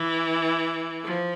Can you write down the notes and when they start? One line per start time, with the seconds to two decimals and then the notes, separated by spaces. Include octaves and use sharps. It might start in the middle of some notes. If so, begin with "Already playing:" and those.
Already playing: E3
1.05 F3